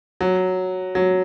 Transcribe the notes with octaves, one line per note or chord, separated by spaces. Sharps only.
F#3
F#3